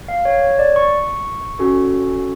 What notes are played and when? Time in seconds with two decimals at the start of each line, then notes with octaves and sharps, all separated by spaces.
0.08 F5
0.25 C#5
0.42 C#5
0.59 D5
0.76 C#6
1.59 C#4 F#4 A4